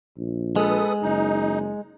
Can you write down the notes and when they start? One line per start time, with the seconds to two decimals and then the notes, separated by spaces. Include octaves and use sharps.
0.17 A#1
0.56 G#3 A4 B4 D#6
1.02 F#1 D#4